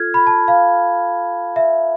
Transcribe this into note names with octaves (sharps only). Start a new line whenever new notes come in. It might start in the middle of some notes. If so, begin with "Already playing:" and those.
Already playing: F4 A4 F6 G#6
B5
A5
F5
E5